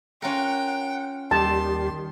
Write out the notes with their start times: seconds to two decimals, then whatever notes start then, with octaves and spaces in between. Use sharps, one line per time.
0.22 C#4 F4 A#4 F#5 G5
1.31 D#2 D#3 G3 G4 A5 C6